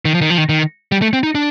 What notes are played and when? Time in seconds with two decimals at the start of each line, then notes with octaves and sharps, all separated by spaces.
0.05 D#3
0.14 F3
0.21 D#3
0.30 F3
0.38 D#3
0.49 D#3
0.92 G3
1.02 A3
1.13 C4
1.23 D#4
1.35 D4